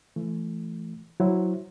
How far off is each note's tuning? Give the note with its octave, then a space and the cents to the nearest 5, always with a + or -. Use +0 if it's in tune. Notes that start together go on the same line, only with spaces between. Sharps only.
E3 +35 A3 +0
F#3 +0 E4 +0 C5 +0